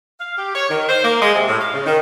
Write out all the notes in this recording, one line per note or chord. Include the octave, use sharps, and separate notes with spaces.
F5
G4
C#5
D#3
C5
A#3
G#3
C3
A2
F5
C#3
D#3